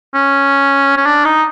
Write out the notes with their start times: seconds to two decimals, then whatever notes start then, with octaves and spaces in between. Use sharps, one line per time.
0.14 C#4
0.97 C#4
1.06 D4
1.25 D#4